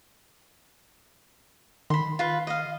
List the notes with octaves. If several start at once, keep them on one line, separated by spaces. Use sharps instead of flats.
D#3 B5 C6
F4 B4
D#5 F5